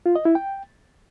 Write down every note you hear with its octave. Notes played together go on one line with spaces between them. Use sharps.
F4
D#5
E4
G5